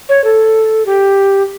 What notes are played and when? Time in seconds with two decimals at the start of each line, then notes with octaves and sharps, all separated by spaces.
0.09 C#5
0.24 A4
0.86 G4